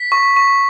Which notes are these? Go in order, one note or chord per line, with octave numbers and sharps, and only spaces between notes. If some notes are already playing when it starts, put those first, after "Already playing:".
Already playing: B6
C#6
C#6